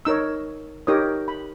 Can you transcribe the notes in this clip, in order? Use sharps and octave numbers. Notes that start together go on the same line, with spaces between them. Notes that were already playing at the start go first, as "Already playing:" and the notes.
D#4 A#4 C#5 E6
D#4 G4 A#4 C#5 D#6
B5